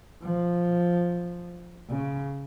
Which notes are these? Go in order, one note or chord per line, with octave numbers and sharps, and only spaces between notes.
F3
C#3